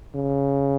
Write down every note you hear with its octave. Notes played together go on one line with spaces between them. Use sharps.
C#3